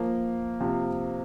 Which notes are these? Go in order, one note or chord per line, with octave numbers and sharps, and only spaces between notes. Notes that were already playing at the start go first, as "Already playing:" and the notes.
Already playing: F3 A#3
C3 F3